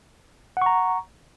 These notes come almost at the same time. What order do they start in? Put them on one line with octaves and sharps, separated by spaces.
F#5 C#6 A#5